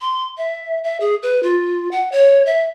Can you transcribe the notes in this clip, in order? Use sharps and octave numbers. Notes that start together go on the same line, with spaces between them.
C6
E5
E5
G#4
B4
F4
F#5
C#5
E5